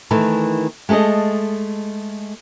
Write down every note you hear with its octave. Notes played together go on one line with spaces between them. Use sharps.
D#3 E3 A3 E4
G#3 A3 G#4 A4 D#5